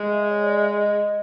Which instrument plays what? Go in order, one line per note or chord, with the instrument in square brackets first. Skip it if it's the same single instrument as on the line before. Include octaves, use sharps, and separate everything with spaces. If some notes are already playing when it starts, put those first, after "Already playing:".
Already playing: [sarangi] G#3
[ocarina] E5
C#5
D5
D#5
E5
D#5